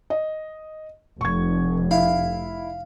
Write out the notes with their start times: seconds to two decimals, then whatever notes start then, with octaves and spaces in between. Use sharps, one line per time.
0.10 D#5
1.21 F1 C#6 G#6
1.91 E4 F5